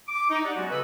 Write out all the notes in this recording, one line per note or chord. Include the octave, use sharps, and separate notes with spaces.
D6
D#4
G4 D5 F#5
F#3 G#3 B3 C#4 F#4
C#3 A4 B4 D#5